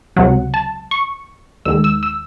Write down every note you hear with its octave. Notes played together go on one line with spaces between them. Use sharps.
C#2 C3 F#3 F#5
A5
C#6
D#2 D#3 G#3 E6
E6
E6